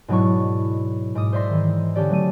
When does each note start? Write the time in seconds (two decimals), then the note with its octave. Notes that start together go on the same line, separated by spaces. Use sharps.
0.08 G#2 B2 F#3 D4 E4 C#6
1.15 G#2 D6 D#6
1.33 C5 D5 E5 C6 A#6
1.49 D#3 E3
1.95 D3 C#4 G4 D5
2.10 F#3 A3 D#7